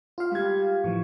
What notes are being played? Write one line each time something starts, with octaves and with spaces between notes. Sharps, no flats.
F4 F5
G3 G#6
A2 E3 F3 C#6